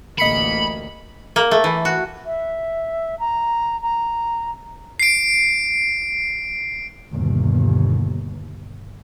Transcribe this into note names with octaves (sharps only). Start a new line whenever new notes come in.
A1 D2 A#3 D#5 B5 B6 C#7
A#3
A3
E3
F#4
E5
A#5
A#5
C7 D7
G1 D#2 B2